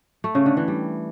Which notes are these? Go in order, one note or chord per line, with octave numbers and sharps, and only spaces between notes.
A3
C#3
D3
E3
G3